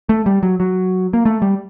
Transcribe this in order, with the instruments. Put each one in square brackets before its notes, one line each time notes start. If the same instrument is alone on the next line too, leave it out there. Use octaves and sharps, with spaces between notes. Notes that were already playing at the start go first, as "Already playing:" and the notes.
[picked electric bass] A3
G3
F#3
F#3
A#3
A3
G3